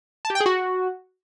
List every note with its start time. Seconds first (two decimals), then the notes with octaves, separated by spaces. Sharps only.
0.25 A5
0.30 G4
0.35 G5
0.40 G#4
0.46 F#4